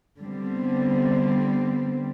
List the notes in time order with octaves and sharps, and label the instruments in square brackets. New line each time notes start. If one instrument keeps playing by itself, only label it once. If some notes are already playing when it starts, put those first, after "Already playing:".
[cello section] D3 G3 B3 C4